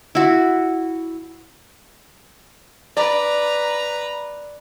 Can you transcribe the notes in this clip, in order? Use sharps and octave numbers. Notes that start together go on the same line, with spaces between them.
E4 F#4
B4 D5 A#5